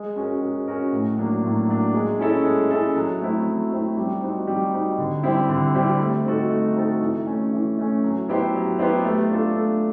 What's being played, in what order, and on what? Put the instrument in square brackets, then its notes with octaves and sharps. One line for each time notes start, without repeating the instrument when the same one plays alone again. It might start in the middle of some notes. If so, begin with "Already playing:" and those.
Already playing: [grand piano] G#3
C#4 F#4 A#4
G#3
C#4 F#4 A#4
A2
F#3 A#3 D4
A2
F#3 A#3 D4
G#3
C#4 E4 A4
G#3
C#4 E4 A4
F#3
A3 C4 E4
F#3
A3 C4 E4
G3
C4 D#4 F#4
G3
C4 D#4 F#4
D3
G3 C4 E4
D3
G3 C4 E4
A3
C4 D#4 F#4 A4
A3
C4 D#4 F#4 A4
E3
A3 C#4
E3
A3 C#4
F#3
B3 E4 G4 C5
F#3
B3 E4 G4 C5
A3
D4 F4 A4
A3